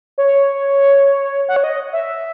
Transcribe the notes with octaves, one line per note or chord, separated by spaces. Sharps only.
C#5
F#5
C#5
D#5
E5